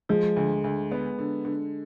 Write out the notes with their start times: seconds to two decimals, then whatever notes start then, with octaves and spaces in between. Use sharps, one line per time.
0.09 F3 G#3
0.36 D2
0.64 D2
0.92 B3
1.19 D3
1.45 D3